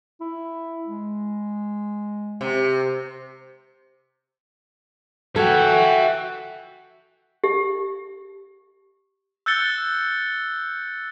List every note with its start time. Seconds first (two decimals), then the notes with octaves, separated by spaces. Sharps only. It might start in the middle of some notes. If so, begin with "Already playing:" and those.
0.21 E4
0.87 G#3
2.41 C3
5.36 F#4 A4 E5 G5 G#5
7.44 G4
9.46 E6 F#6 G6 A6 C#7 G7